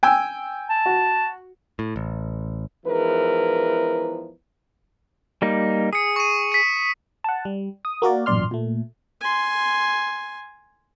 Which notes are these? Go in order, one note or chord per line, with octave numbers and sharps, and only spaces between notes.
G5 G#5 E6
A5
F#4
A2
A1
E2 G#2 E3 F3 A#4 B4
G3 A#3 D#4
G#4 D#6 C#7
C#6 D#7
B6 C#7
F#5 A5
G3
D#6
A#3 F#4 A#4 D5
A1 F#2 A#2 D5 C6 F6
A#2 A3
G#5 C6